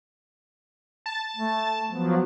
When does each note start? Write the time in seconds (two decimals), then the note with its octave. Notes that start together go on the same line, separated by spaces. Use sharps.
1.06 A5
1.37 A3
1.90 F3 F#3 B3